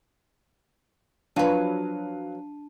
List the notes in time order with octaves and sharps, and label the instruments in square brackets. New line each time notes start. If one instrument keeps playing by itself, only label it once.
[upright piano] F3 F5 [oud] F#3 B4 [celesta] D4 A5 D#7